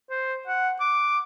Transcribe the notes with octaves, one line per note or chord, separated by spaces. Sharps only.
C5
F#5
D6